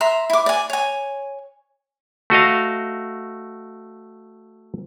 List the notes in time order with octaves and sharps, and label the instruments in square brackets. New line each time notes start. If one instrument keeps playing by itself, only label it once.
[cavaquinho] E5 A#5 C6
E4 D6
D5 G#5
C#5 G#5
[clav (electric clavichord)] A3 F#4 D#5 F5